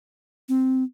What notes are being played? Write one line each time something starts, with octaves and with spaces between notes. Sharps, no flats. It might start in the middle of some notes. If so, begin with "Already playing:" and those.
C4